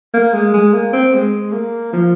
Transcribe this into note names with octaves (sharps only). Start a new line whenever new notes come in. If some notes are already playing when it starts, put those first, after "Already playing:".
A#3
G#3
G#3
A#3
C4
G#3
A#3
F3